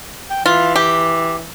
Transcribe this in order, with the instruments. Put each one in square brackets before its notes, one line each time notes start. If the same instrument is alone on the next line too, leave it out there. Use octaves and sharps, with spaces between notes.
[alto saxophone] G5
[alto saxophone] E3 [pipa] F4
[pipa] G4